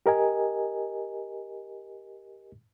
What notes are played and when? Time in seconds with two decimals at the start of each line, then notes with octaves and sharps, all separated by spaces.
0.06 G4 A#4 D#5 G#5